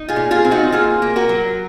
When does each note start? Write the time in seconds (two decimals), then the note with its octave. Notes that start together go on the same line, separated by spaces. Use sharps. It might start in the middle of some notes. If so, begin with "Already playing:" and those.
Already playing: D#4
0.09 F4 G#4
0.16 A#2
0.31 F4 G#4
0.45 C4
0.51 D#4 F#4
0.72 A#3 F4 G#4
1.02 A#3
1.16 F#4 A#4
1.29 F#3